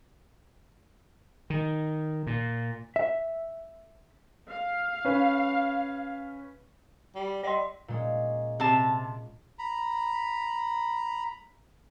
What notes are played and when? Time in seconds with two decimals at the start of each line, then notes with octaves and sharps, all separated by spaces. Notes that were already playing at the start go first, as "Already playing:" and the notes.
1.50 D#3
2.27 A#2
2.96 E5
4.49 F5
5.05 C#4 B4
7.15 G3
7.43 G3 D5 D#5 C6
7.88 A#2 G#3 C#4
8.60 C3 A5
9.59 A#5 B5